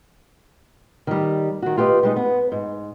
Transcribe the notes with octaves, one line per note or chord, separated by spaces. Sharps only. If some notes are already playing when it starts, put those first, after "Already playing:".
D#3 G3
D#3 F#4
F4 G4 B4 D#5
G3 G#3 D#4
B3
G#2